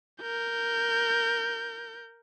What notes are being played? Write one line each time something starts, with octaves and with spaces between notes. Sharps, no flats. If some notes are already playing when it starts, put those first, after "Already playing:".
A#4 G6